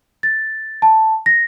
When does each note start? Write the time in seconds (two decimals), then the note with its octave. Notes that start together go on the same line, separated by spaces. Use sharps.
0.23 A6
0.82 A5
1.26 A#6